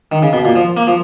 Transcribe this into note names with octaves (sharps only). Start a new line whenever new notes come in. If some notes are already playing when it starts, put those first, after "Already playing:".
D#3
C#3
B2
A#2
F3
A#3
F3